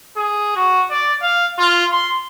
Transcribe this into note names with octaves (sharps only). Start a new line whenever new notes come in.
G#4
F#4
D5
F5
F4
C6